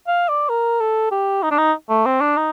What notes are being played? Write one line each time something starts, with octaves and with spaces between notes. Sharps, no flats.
F5
D5
A#4
A4
G4
D#4
D4
D#4
A3
C4
D4
D#4